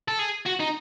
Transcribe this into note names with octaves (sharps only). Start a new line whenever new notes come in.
A4
G#4
F#4
D#4